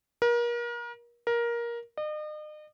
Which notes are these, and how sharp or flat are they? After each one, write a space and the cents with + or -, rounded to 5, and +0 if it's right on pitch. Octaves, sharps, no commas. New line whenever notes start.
A#4 +35
A#4 +15
D#5 -40